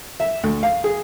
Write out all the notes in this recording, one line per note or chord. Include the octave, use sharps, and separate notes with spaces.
E5
D2
F5
G#4